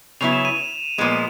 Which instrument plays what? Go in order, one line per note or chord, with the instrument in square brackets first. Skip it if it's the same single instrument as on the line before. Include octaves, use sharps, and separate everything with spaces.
[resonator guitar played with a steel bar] C#3 F#3 B3 E4 [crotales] F7
[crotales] E7
D#7
E7
[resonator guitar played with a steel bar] A#2 F3 G#3 B3